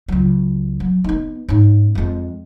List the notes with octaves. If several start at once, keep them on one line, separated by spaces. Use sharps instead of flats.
C#2 F#3
F#3
B3 D#4
G#2 C#4
F2 G#3